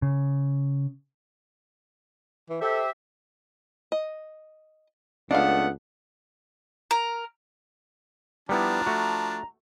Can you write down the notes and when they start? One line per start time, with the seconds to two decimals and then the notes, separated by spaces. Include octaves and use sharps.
0.02 C#3
2.49 E3
2.61 G4 A4 C5 E5
3.92 D#5
5.31 C#2 A3 B3 D4 D#5 F5 F#5
6.91 A#4
8.49 F3 G3 B3 D4 E4 A#5
8.86 A3 F#4